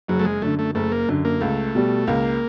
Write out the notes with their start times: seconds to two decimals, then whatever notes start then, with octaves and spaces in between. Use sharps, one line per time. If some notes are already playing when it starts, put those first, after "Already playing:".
0.08 F#1 F#3
0.19 A3
0.25 G#3
0.42 F#2 D3 A3
0.59 A3
0.75 F#1 A3
0.92 A#3
1.09 F#2 D3
1.25 A#3
1.41 C#2 A3
1.75 B2 G3
2.07 C#2 A#3